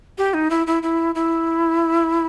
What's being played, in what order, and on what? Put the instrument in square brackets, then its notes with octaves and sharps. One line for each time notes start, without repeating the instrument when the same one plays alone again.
[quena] G4
D#4
E4
E4
E4
E4